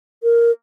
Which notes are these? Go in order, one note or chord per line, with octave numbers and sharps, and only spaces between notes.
A#4